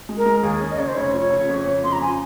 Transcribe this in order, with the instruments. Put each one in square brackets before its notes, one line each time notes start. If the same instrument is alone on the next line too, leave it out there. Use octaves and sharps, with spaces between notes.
[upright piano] G#3
[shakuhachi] A#4
[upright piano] G#3
[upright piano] D#2 [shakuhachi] G#4
[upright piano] C#4
[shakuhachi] D#5
[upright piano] C#3 [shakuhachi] C#5
[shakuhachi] C5
[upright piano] F1 [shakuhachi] C#5
[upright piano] F3
C#3
F2
C#3
[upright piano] F2 [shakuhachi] C6
[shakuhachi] A#5
[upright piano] F3 [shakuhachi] G#5